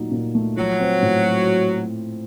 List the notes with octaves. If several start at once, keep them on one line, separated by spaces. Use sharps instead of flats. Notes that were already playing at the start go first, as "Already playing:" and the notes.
Already playing: A#2 F#3 A3 D#4
A#2
A3
F3 F#3
C4
A2